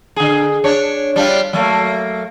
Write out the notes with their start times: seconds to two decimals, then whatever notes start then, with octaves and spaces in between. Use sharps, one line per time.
0.16 D3 G#4
0.64 D4 C#5
1.16 G3 D4 F4
1.53 F#3 A3 A#3